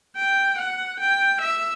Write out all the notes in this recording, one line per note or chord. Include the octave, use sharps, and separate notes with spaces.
G5
F#5
G5
E5